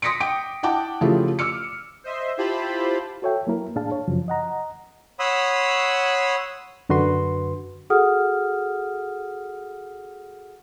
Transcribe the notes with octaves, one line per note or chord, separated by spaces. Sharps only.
C6 D#6 A#6 B6 C#7 D7
G5 D6 D7
E4 F#5 G5 A5 D6
C#3 F3 A3 E4 F4 G4
D6 E6 F6 C#7
C5 D#5 E5 C6
E4 F4 G4 C5 A5 B5
F#4 A4 C#5 E5 G5
F#3 A#3 E4 A#4
A2 D4 G#4 F5 A5
C#5
F#2 C#3 F3 F#3
D#5 F#5 A#5
C#5 F#5 B5 C6 D#6 E6
F#2 D3 F#4 B4 C6
F#4 G#4 A4 F#5 D#6 F6